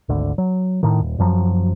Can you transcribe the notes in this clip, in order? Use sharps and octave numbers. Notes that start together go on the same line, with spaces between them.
G#1 D2 D3
F#3
A2 D#3
D#1
F#1 F#2 F3 F#3